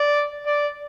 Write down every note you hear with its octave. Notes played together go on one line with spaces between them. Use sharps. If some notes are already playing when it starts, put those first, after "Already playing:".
Already playing: D5
D5